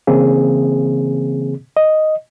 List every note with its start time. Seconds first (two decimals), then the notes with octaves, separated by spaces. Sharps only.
0.07 C#3 E3 A#3 C4 G#4
1.77 D#5